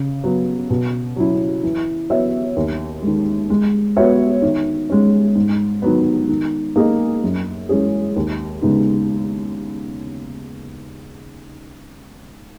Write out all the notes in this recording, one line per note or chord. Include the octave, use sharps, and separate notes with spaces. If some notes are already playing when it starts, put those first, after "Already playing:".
Already playing: C#3
F#3 B3
B2
F#3 C#4 E4
E3
B3 F#4 C#5 E5
D#2
D#3 G#3
G#3
B3 F#4 C#5 E5
D#3
G#3 C#4
G#2
D#3 F#3 B3
D#3
A#3 D#4 G#4 D#5
F#2
E3 G#3 C#4 G#4
D#2
C#3 G#3 B3 D#4